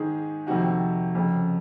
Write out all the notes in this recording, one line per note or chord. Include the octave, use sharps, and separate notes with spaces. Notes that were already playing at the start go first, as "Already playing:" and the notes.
Already playing: G#2 D#3 G#4
F2 C3 D#3 F#4
F2 C#3